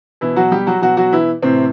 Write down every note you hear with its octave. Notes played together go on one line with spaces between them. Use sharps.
B2 E3 E4
F#3 F#4
G3 G4
F#3 F#4
B2 F#3 F#4
F#3 F#4
E3 E4
A2 C3 E3 C4